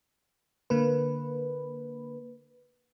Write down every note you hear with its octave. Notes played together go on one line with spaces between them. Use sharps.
D3 A#3 B4